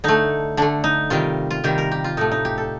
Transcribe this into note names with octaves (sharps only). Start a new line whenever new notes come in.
D3 A3 D#4
D3 A3 D4
D#4
C3 D#3 G3 F4
F4
C3 D#3 G3 G4
A#4
G4
F4
A2 A3 D#4
D#4
G4
A4